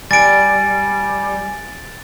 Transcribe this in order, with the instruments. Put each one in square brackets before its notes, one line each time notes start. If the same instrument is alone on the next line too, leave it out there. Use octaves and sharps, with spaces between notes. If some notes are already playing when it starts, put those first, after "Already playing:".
[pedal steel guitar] G3 [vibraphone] G#5 [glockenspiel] A6 D7